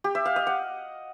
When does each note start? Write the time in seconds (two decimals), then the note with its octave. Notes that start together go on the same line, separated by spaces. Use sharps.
0.04 G4
0.15 E5
0.26 F5
0.36 D#5
0.47 F#5